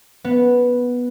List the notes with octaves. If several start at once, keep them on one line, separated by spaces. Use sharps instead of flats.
B3